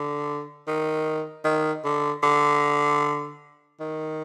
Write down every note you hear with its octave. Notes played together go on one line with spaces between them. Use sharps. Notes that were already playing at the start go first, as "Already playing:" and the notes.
Already playing: D3
D#3
D#3
D3
D3
D#3